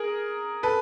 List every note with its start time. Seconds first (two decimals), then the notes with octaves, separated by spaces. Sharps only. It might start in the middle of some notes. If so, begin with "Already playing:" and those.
Already playing: G#4 A#4
0.63 A4 B4